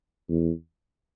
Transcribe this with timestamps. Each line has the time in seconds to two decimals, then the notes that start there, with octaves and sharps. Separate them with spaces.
0.29 E2